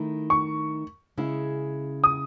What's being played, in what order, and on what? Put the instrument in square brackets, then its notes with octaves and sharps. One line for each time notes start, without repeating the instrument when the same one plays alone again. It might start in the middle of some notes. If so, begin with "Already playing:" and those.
Already playing: [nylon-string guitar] D#3 A3 E4
[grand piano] C#6
[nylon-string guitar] C#3 G#3 C#4 E4
[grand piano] D#6